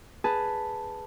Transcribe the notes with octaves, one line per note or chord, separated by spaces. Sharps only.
G#4 B4 A5